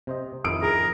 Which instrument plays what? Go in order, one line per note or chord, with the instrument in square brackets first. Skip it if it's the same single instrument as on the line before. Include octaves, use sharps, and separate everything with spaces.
[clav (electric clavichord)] C3 C5 D#5
[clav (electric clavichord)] F2 D#3 E4 [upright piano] D#6 D7
[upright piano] G#4 [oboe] A#4